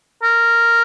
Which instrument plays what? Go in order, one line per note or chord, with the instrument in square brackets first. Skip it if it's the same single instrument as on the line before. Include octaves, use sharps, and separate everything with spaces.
[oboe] A#4